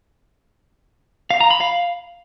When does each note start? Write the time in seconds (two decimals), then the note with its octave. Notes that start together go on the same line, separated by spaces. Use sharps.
1.30 F5
1.41 A#5
1.51 B5
1.61 F5